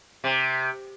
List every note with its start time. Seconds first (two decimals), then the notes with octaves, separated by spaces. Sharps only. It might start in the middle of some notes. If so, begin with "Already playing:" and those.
0.24 C3